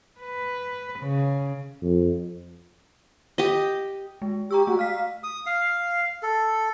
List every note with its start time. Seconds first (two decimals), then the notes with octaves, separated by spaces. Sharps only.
0.20 B4
1.00 C#3
1.82 F2
3.38 G4 D#5
4.22 G#3
4.51 G4 A#5 C#6 E6
4.67 A3 F#4
4.79 F5 F6 B6
5.23 D#6
5.46 F5
6.23 A4